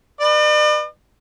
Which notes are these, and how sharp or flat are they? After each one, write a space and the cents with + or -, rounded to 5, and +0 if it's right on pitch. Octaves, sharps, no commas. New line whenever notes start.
B4 +0 D5 +45